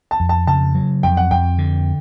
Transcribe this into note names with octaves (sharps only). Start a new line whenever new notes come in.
A5
F2
A5
C#3 A5
F#3
F2 G5
F#5
F2 G5
D3